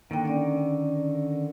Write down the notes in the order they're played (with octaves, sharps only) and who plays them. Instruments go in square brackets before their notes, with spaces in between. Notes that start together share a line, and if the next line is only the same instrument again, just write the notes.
[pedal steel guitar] D3 D#3 [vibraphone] A#3 G5
[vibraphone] C#4 D5